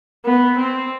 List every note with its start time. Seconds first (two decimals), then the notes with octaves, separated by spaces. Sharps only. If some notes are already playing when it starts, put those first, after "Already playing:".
0.25 B3
0.58 C4